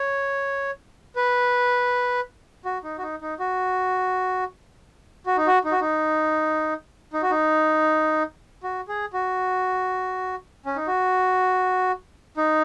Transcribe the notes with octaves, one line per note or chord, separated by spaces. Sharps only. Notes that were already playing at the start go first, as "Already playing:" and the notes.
Already playing: C#5
B4
F#4
D#4
F#4
D#4
D#4
F#4
F#4
D#4
F#4
D#4
F#4
D#4
D#4
F#4
D#4
F#4
G#4
F#4
C#4
D#4
F#4
D#4